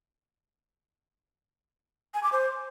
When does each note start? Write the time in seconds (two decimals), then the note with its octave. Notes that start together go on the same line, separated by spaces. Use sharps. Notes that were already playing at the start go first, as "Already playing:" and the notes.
2.14 G#5
2.23 D6
2.32 C5